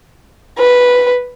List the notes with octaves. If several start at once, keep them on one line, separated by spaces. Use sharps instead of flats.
B4